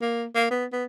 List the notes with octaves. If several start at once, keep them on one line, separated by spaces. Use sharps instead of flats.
A#3
A#3
B3
B3